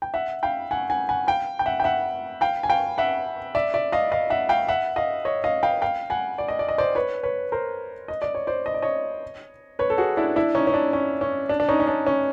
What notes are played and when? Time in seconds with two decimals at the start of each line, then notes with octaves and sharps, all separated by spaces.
0.02 G5
0.14 E5 F#5
0.43 F5 G5
0.71 F#5 G#5
0.90 F#5 G#5
1.09 F#5 G#5
1.27 F5 G5
1.59 G5
1.66 E5 F#5
1.80 G5
1.84 E5 F#5
2.41 F5 G5
2.63 G#5
2.69 F5 G5
2.98 E5 F#5
3.55 D5 E5
3.74 D5 E5
3.92 D#5 F5
4.12 D#5 F5
4.30 E5 F#5
4.49 F5 G5
4.68 E5 F#5
4.96 D#5 F5
5.25 C#5 D#5
5.44 D#5 F5
5.63 F5 G5
5.82 F5 G5
6.10 F#5 G#5
6.38 D5
6.48 D#5
6.59 D5
6.69 D#5
6.78 C5 D5
6.95 B4 C#5
7.23 B4 C#5
7.52 A#4 C5
8.08 D#5
8.22 D5
8.35 C#5
8.47 C5 D5
8.66 D#5
8.74 D5
8.82 C#5 D#5
9.79 B4 C#5
9.90 A4
9.98 F#4 G#4
10.17 D4 E4
10.36 D4 E4
10.55 C#4 D#4
10.67 C#4
10.74 D4
10.93 C#4
11.21 C#4
11.49 D4
11.60 D4
11.68 C#4 D#4
11.80 C#4
11.87 D4
12.06 C#4